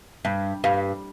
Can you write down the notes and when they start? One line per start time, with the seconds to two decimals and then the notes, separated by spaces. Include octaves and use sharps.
0.25 G2
0.64 G2 F5